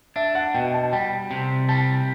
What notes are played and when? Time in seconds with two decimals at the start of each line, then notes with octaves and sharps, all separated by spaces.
0.16 D4 E5
0.35 F#5
0.55 B2 G5
0.74 A5
0.93 G3 G5
1.31 C3
1.69 G3 A5